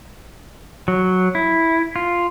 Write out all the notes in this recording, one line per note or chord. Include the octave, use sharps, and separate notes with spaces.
F#3
E4
F4